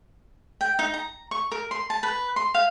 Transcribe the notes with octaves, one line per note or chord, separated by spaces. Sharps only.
G5
D#4
A#5
C#6
A#4
C6
A5
B4
C6
F5